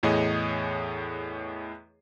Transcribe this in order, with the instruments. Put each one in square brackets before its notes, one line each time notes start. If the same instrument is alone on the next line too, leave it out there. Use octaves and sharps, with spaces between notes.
[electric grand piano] E2 A2 G#4 C#5 D#5